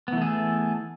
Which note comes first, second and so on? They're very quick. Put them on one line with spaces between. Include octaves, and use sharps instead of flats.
B3 E3 A3 G#4 A4